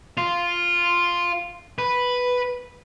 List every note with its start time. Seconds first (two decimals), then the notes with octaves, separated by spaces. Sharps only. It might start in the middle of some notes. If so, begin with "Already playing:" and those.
0.17 F4
1.78 B4